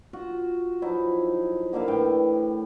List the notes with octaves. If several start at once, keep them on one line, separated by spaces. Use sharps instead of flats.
F4 F#4 F#5
F3 F#3 D#4 E4
D3 A#3 E4 F5
A2 E3 G5